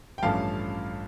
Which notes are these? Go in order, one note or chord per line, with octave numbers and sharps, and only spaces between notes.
G5
A1 G2 F3 A3 C#4 F5 A5